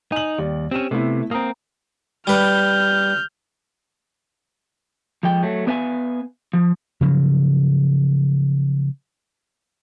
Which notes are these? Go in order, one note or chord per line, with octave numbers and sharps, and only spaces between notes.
D#4 G#5 F#7
D#2 G3 D5
C4 C#4 G4 E7
C3 A3 B3 E4
A#3 C4 A#5 D#6
G3 B4 F6 G6
F3 G#3 G5
F#3 A3
B3 D4 B4 E5 F5 G#5
F3
C#3 F3 F#3